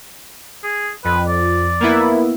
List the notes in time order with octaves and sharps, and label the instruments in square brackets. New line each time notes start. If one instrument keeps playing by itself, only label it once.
[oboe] G#4
[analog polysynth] F2 [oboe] B4
[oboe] D5
[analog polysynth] A#3 B3 E4